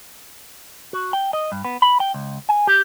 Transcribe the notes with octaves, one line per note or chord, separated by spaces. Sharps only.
F#4
G5
D#5
G2
B3
B5
G5
C#2
G#5
G4